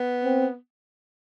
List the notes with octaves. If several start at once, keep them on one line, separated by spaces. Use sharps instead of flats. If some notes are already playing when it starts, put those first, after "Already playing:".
Already playing: B3
C4